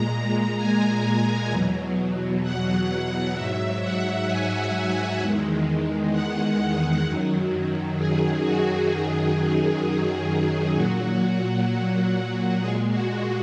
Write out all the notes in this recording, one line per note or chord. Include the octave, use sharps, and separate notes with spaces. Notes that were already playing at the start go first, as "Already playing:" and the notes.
Already playing: A#2 G#3 A#5
G#5
E2 B2 F#3
F#5
G#2 F#3 E5
F#5
G#5
E2 D#3 G#3
F#5
F#2 D#3 F#3
G#4
F#4
F#2 D#3 F#3 G#4
G#4
A#2 F#3 F#4
A#2 G#3 G#4
F#4